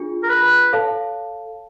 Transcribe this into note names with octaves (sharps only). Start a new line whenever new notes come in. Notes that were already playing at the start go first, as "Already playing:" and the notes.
Already playing: D4 F4 G#4
A#4
B4
A4 C#5 F5 A5